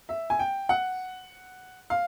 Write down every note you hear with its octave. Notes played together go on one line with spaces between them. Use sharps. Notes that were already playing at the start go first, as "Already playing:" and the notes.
E5
G#5
G5
F#5
F5